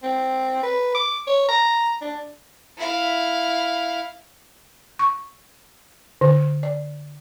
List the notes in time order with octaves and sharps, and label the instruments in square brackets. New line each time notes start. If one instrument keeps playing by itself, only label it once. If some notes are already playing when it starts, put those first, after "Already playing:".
[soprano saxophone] C4
B4
D6
C#5
A#5
D4
[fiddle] E4 F5
[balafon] C#6
D3
D5